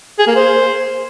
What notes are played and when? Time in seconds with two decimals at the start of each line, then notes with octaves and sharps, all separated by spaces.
0.19 G#4
0.27 A#3
0.36 C5